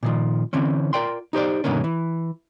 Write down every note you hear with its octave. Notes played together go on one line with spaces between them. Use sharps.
A#2 D#3 F3
D3 E3 C4 C#4
F4 A#4 D5 G5 C6
D#4 G4 C5 D5
G2 B2 D3 D#3 A#3 C#4
E3